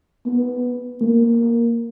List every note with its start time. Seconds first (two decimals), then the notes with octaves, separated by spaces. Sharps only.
0.26 B3
1.01 A#3